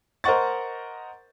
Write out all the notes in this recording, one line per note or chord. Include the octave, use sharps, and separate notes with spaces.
A#4 C5 D#5 F#5 C#6 A6